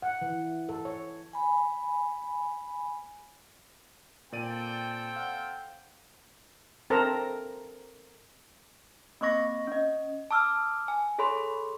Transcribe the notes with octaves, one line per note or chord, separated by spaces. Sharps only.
F#5
E3
A4
C#5
G#5 B5
A#2 C4 A4 D5 G5 D#7
F5 F#5
C4 A4 A#4 C5 A5 A#5
A#3 C4 D#5 C#6 A#6
C#4 D#5
A5 D6 E6 F6
G#5
G#4 A4 C#5 B5 C6